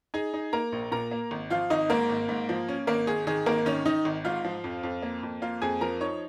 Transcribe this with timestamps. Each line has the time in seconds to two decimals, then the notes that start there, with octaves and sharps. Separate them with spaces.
0.14 D#4 G#4 G#5
0.34 D#4
0.53 A#3 A#4 A#5
0.72 A#1
0.92 A#2 A#4 A#5
1.11 A#3
1.31 G#1
1.50 F3 F4 F5
1.70 G#1 D#4 D#5
1.90 G#2 A#3 A#4
2.09 G#1
2.29 G#2
2.49 F3
2.68 C#4
2.87 G#1 A#3 A#4
3.07 G#1 G#4
3.27 D#3 G#4
3.46 G#1 A#3 A#4
3.66 D#3 C#4 C#5
3.85 D#3 D#4 D#5
4.05 G#1
4.25 G#2 F4 F5
4.44 F3
4.64 F2
4.83 F2
5.03 A#3
5.23 F2
5.42 A#3 F4 F5
5.62 F2 G#4 G#5
5.81 F3 A#4 A#5
6.01 D#4 C#5 C#6